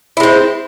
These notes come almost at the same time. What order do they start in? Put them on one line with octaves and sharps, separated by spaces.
E4 G#3 C4